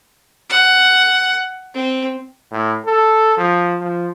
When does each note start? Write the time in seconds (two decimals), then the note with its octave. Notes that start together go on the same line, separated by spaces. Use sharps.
0.50 F#5
1.74 C4
2.52 A2
2.86 A4
3.38 F3
3.80 F3